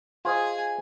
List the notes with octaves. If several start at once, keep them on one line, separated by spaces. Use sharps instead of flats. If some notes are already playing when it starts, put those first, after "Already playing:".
F4 G#4 C5 D#5 G#5